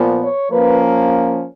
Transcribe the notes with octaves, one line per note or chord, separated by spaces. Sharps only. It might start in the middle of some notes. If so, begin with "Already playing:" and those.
Already playing: A#2 F3 B3
C#5
F3 A#3 C#4 B4